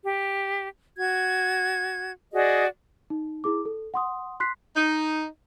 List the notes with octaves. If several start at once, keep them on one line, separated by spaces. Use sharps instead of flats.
G4
F#4 G#6
F#4 G#4 D5 D#5
D#4
E4 G#4 D6
A4
F#5 C6 D#6
C6 F#6 B6 C7
D#4